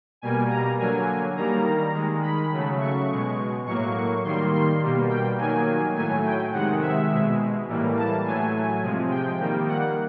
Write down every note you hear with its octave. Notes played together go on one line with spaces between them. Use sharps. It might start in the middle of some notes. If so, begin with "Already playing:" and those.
B2 G3 A#3 G#5
A#5
D3 F#3 A#3 G#5
D#3 G3 A#3 A#5
D#3 G#3
B5
C#3 F#3 A3
C#6
B2 G#3
A2 F#3 A#3 C#6
D#3 G3 A#3 C6
C6
B2 G3 A#3
G5
D#3 F#3 A#3 G#5
A2 F#3 A3 G#5
G5
C3 D#3 G#3 F#5
E5
B2 G#3
A2 E3 G3 A#3
A5
A2 F#3 A3 G#5
C3 F3 G#3
G5
D#3 G3 A#3
F#5